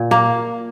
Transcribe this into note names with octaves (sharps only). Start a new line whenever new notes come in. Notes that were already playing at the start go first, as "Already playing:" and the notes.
Already playing: A#2
A#3